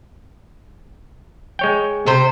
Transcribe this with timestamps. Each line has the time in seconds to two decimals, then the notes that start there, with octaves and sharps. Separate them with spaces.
1.59 G#3 C#5 G5
2.07 C3 C5